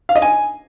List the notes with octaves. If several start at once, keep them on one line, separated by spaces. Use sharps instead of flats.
F5
D#5
G#5